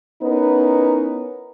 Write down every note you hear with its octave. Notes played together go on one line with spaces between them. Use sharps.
B3 C#4 D#4 E4 A#4 B4